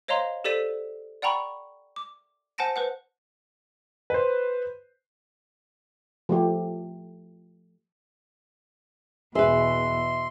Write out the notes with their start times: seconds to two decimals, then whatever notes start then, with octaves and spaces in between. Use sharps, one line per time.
0.08 C5 C#5 D#5 F5 A#5 C6
0.44 G4 A4 C5 D5 B6 D#7
1.22 D5 F#5 G5 A#5 B5 C#6
1.96 D6
2.58 C5 F#5 G#5 A5 A#6 D7
2.76 B4 C5 F#5
4.10 B4 C5
6.29 F3 A3 G4
9.35 E2 B2 G#4 B4 E5 C6